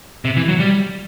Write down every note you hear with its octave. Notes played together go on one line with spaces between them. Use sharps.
C3
E3
F#3
G3